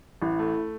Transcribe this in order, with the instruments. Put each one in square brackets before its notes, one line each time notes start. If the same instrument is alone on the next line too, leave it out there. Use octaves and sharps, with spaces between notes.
[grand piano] A1 [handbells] E4
[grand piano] A3